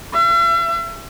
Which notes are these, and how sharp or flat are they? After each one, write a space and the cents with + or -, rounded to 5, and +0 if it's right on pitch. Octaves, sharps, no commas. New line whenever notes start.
E5 +45